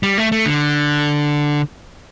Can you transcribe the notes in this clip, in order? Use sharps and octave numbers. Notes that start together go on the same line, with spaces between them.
G3
A3
A3
D3